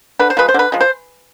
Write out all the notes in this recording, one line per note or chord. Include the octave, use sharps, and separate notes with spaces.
D3 B4
C5
F3 G#3 B4
C5
D3 B4
F3 G#3
C5